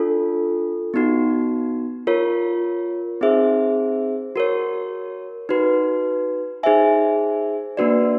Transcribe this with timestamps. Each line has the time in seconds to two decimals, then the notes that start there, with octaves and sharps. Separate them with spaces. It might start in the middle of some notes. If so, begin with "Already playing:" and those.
Already playing: D4 F4 A4
0.94 B3 D#4 F#4
2.07 F4 A#4 C#5
3.21 C4 D#4 G#4 C5 E5
4.36 F#4 A#4 C#5
5.49 D#4 F#4 B4
6.63 D#4 G#4 C5 E5 G#5
7.77 A#3 D4 F#4 B4 D5